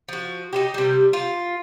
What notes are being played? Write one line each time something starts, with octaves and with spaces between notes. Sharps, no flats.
F3 F#4
D#4 F4 G4
C3 G3
F4